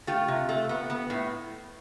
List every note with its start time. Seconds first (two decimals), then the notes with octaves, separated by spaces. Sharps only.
0.07 A3 F4 G4
0.28 C3
0.49 A3
0.69 B3
0.90 B3
1.10 A2